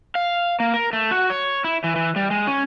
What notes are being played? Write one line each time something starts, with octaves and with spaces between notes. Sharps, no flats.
F5
A#3
A#4
A3
F#4
C#5
E4
E3
E3
G3
G#3
C#4